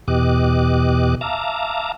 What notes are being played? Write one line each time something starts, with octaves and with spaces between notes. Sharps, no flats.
E2 B2 G4 D#5 D6 F#6
E5 F5 A5 A#5 D6